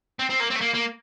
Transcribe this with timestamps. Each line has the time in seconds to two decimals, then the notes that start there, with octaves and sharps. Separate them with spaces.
0.19 C4
0.30 C4
0.40 A#3
0.51 C4
0.56 A3
0.61 A#3
0.75 A#3